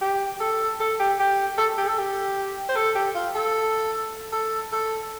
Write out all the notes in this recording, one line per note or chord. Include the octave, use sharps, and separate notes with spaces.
G4
A4
A4
G4
G4
A4
G4
A4
G4
C5
A4
G4
F4
A4
A4
A4